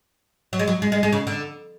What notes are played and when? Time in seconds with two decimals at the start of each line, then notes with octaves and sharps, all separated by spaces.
0.53 F#3
0.59 G#3
0.68 F#3
0.82 G#3
0.92 G#3
1.03 G#3
1.12 C#3
1.27 D3